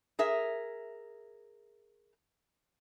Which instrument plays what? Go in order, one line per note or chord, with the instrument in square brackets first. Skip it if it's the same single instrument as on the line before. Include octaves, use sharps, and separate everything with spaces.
[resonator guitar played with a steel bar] G#4 A#4 E5